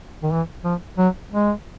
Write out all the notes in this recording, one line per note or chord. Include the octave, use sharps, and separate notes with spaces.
D#3
E3
F3
F#3
G#3